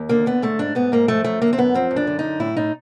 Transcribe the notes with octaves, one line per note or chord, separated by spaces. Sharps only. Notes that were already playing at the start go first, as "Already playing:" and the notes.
Already playing: D#2
D3 A#3
D3 B3
G#2 A3
G#2 D4
G#2 B3
G#2 A#3
F3 A3
F#2 A3
D3 A#3
C4
F#2 B3
F3 C4
F#2
D4
D3
D#4
F#2
A2 E4
A2 D#4